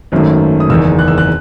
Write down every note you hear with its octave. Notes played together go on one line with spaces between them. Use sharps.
G#1 F#2 D#3 A3
D#6
F#1 E2 D#3 E6
F#6
E6
F#6